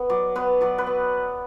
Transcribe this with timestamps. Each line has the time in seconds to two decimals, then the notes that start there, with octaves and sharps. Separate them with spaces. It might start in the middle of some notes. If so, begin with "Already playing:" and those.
Already playing: B3
0.09 F#3 D5
0.35 B3 B4
0.61 F#3 D5
0.78 B4
0.87 B3